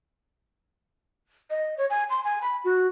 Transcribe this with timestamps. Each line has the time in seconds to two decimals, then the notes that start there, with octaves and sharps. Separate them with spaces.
1.50 D#5
1.78 C#5
1.90 G#5
2.10 C6
2.24 G#5
2.42 B5
2.64 F#4